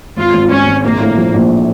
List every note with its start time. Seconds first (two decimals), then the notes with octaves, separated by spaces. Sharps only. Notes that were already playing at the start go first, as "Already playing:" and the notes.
0.16 G#1 F4
0.34 G#1
0.50 G#1 C#4
0.67 G#1
0.84 A#1 A#3
1.00 A2
1.17 F3
1.34 A#1